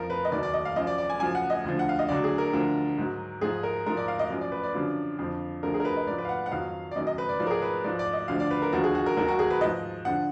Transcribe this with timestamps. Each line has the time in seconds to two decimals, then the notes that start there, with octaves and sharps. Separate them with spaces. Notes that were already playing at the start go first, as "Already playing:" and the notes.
Already playing: F2 F3 A#4
0.10 B4
0.25 D#5
0.32 D#2 D#3 F#3 D5
0.43 D5
0.54 D#5
0.65 F5
0.76 F#2 F3 D#5
0.87 D5
0.98 D5
1.10 G#5
1.20 F#2 F3 G#5
1.35 F#5
1.50 D#5
1.64 D2 D3 F3
1.79 F#5
1.89 F5
1.99 D#5
2.09 D2 D3 F#3 D5
2.24 G#4
2.38 A#4
2.53 D2 D3 F3
2.98 G#2 F#3
3.41 G#2 F3 G#4
3.63 A#4
3.86 G#2 F3 A#4
3.97 D5
4.08 F5
4.19 D#5
4.30 F#2 F3
4.41 D5
4.52 B4
4.63 D5
4.75 F#2 D3 F3
5.19 F2 D3 F3
5.63 D2 D3 F3 A#4
5.74 G#4
5.80 A#4
5.85 B4
5.96 D#5
6.07 G#2 F3 D5
6.18 B4
6.25 F5
6.29 F#5
6.46 F#5
6.51 F2 D#3 F#3 F5
6.91 D5
6.96 F#2 D#3 F#3 D#5
7.07 D#5
7.18 B4
7.29 D5
7.40 G#2 F3 D5
7.47 A#4
7.51 G#4
7.62 B4
7.84 G#2 F3 D5
7.99 D5
8.13 D#5
8.28 D2 D3 F3 F5
8.40 D5
8.51 B4
8.62 A#4
8.73 D#2 D3 F3 F#4
8.84 G#4
8.95 F#4
9.06 A#4
9.17 D#2 D#3 F#3 A#4
9.28 F#4
9.39 G#4
9.50 B4
9.61 G#2 F3 D#5
10.05 D3 F3 F#5